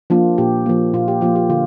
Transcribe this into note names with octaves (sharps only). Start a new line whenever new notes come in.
F3 A#3 D4 F4
A#2 G4
F3 A#3
A#2 F4
G4
F3 A#3 F4
G4
D3 F4